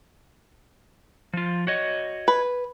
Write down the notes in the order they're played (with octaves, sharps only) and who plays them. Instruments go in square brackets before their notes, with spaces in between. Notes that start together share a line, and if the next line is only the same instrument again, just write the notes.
[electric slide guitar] F3 F4
F#4 C#5 D#5
[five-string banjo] B4